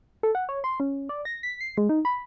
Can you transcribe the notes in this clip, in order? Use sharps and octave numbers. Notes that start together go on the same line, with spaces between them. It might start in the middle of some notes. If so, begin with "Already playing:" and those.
A4
F#5
C#5
C6
C#4
D5
A#6
B6
C7
G#3
D#4
B5